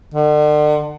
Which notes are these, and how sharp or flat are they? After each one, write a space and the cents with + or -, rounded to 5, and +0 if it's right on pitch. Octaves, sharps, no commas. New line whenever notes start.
D3 +40